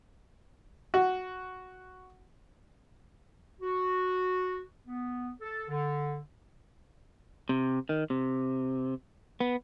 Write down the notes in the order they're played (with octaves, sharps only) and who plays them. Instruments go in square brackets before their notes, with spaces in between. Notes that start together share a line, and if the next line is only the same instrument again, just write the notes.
[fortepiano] F#4
[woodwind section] F#4
B3
A4
D3
[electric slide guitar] C3
D#3
C3
B3